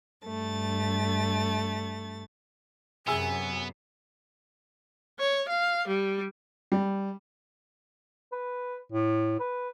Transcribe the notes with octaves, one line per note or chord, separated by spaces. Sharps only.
G2 A3 A6
F#2 C3 B3 G#4 G#5 E6
C#5
F5
G3
G3
B4
A2
B4